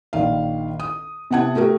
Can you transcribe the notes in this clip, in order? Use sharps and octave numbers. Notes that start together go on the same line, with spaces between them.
A#1 D#3 F5
D#6
C3 B3 E4 F#5 A5 G#6
A3 F#4 G4 A#4